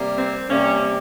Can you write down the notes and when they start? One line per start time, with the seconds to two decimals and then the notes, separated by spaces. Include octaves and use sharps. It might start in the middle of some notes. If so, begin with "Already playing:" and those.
Already playing: C3 G3 A#3
0.15 C4
0.49 C3 G3 A#3 C#4